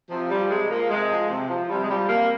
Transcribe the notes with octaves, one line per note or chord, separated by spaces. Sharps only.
C3 F3
F3 G3
C3 G#3
F3 A#3
C3 G#3
F3
C3
F3
C3 G3
G#3
F3 G3
C3 A#3